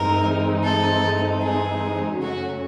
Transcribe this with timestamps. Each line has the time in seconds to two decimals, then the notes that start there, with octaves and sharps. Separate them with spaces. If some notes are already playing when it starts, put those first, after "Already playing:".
Already playing: G2 E3 G#3 C4 D#4 A#4
0.63 A4
1.42 G#4
2.21 F#2 C#3 F#3 A3 C#4 F#4